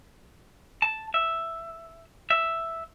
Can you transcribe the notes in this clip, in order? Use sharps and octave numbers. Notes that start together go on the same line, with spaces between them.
A5
E5
E5